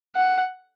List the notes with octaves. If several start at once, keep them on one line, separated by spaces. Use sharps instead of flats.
F#5